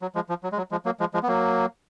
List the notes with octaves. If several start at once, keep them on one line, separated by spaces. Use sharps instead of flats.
F#3
F3 G#3
F3
F#3
G#3
F#3
F3 G#3
F#3 A#3
F3 G#3
F3 G#3
B3
F#3 A#3